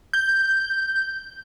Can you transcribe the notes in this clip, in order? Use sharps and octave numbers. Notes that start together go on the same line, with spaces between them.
G6